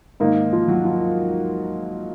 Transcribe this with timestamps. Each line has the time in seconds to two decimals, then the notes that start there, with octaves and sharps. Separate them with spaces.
0.20 G#2 D#3 A#3 D#4
0.52 F3 F4
0.68 F#3 F#4
0.85 F3 F4